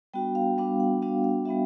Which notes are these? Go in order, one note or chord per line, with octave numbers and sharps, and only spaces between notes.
G3 B3 D4 F#4 G5
F5
G3 B3 D4 F#4 F5
F#5
G3 B3 D4 F#4 F5
F5
G3 B3 D4 F#4 E5